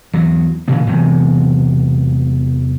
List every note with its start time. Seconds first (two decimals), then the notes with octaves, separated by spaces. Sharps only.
0.13 E2 F#3
0.68 A#2 C#3 E3 A#3
0.87 E1 E2 C3 F#3